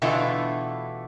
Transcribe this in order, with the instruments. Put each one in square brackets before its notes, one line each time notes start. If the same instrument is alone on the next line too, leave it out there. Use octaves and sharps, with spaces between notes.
[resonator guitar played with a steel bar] B2 D3 E3 A3 E4 F4